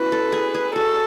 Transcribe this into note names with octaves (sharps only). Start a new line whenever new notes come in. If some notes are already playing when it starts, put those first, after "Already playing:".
Already playing: B3 C#4 E4 F#4 B4
A4
G#4
G#4
F#4 A4